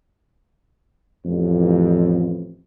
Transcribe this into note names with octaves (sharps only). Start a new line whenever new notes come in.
A1 F2